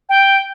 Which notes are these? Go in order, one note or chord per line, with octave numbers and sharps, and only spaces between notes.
G5